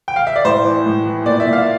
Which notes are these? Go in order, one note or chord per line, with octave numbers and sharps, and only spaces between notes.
G5
F5
E5
D5
A2 C5
E3
A2
E3
A#2 D5
E5
A#2
F5